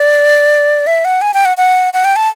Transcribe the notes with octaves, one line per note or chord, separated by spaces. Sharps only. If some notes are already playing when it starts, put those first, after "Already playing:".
Already playing: D5
E5
F#5
G#5
G5
F#5
F#5
F#5
G5
A5